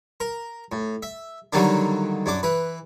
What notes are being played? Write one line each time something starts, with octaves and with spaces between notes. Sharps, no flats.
A#4
A2
E5
D3 D#3 F#3 G3 A#3 D4
F#2 D4 D6
E3 B4